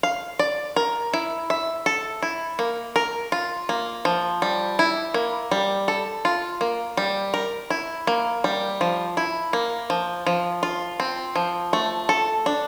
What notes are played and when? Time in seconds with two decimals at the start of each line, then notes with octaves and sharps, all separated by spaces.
0.03 F5
0.39 D5
0.76 A#4
1.14 E4
1.50 E5
1.86 A4
2.23 E4
2.59 A#3
2.96 A#4
3.32 F4
3.69 A#3
4.05 F3
4.42 G3
4.79 E4
5.14 A#3
5.51 G3
5.88 A4
6.25 F4
6.61 A#3
6.97 G3
7.34 A#4
7.70 E4
8.07 A#3
8.44 G3
8.81 F3
9.17 E4
9.53 A#3
9.90 F3
10.26 F3
10.63 F4
11.00 C4
11.36 F3
11.73 A3
12.09 A4
12.46 D4